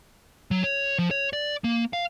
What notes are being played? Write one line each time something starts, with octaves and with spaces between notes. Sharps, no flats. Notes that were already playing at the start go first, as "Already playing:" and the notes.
F#3
C#5
F3
C#5
D5
A#3
F5